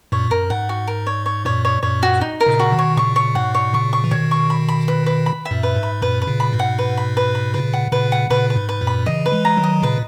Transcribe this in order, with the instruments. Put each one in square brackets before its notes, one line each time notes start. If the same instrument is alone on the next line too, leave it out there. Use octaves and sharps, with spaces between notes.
[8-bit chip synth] F#2 A#2 [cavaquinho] C#5
[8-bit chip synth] F#2 [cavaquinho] A#4
[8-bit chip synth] G#2 [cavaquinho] F#5
[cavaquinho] F#4
A#4
C#5
C#5
[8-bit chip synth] F#2 A#2 [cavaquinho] C#5
[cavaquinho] C#5
[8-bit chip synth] F#2 A#2 [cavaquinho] C#5
[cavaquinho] F#4
D#4
A#4
[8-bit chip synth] A#2 C#3
[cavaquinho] F#4
[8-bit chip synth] B2 D#3
[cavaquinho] C#5
[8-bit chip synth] A#2 C#3 [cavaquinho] C#6
[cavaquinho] C#5
[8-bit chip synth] G#2 B2 [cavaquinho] F#5
[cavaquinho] C#5
[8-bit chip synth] A#2 C#3 [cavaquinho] C#6
[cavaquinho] C#6
[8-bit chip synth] E3
[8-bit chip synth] B2 D#3 [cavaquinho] C#5
[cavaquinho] C#6
B5
B5
B4
B4
B5
E5
[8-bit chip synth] F#2 A#2
[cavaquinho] B4
[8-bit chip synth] G#2
[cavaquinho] B5
[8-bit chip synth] F#2 A#2 [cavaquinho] B4
[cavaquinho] B4
[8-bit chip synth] A#2 C#3
[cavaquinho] B5
[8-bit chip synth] G#2 B2
[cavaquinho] F#5
B4
B5
B4
B5
[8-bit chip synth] A#2 C#3 [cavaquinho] B4
[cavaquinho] F#5
[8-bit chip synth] A#2 C#3 [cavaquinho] B4
[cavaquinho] F#5
[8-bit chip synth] A#2 C#3 [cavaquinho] B4
[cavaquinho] B4
[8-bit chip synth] G#2
[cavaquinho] B4
[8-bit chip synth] F#2 A#2
[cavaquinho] B5
[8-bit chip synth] C#3 E3 [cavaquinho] D#5
[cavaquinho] B4
[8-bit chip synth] E3 G#3
[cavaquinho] A#5
[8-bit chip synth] D#3 F#3
[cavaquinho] D#5
[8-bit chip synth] A#2 C#3 [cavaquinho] B4